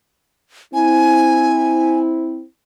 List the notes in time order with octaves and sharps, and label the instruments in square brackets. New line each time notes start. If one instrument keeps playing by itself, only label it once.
[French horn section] C4 E4 [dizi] G#5